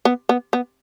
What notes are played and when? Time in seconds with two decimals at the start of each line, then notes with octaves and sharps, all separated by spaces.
0.05 B3
0.29 B3
0.53 B3